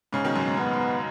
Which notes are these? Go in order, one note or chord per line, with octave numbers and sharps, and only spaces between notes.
G#2 C#3 C#4
B2 D#3
F#2 B2
G#2
F#2 B3
G#2